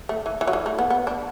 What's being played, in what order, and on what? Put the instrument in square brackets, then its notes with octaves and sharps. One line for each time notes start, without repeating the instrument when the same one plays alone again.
[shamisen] A3
E3
E3
F#3
E3
A3
B3
B3
D4